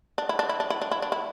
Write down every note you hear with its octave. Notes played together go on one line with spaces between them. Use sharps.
D4
E4
D4
E4
D4
E4
D4
E4
D4
E4